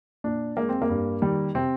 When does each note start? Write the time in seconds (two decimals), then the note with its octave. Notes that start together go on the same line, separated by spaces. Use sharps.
0.24 A#2 D4
0.57 G#3 A#3
0.69 C4
0.82 A#3
0.89 G2
1.22 D#3 G3
1.55 C3 C4